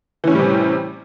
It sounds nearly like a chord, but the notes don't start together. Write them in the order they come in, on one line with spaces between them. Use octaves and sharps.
E3 C#4 A2 G3 C3